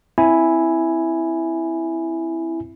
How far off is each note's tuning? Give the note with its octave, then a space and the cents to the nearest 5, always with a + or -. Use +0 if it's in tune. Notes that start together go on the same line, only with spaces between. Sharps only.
C4 +0 E4 +0 G#5 +0